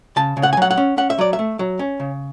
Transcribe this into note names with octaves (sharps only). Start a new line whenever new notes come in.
C#3 A5
C#3
F#5
G#5
F#3 F#5
F#5
C#4
C#4 F#5
E5
F#3 D5
E5
A3
F#3
C#4
C#3